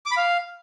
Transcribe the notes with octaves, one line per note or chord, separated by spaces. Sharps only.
D6
B5
F5